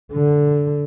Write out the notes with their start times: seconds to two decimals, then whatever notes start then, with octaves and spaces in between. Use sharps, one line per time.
0.12 D3